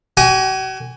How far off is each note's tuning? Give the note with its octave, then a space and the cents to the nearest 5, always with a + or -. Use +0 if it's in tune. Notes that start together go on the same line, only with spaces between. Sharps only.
F#4 +45 G#5 -5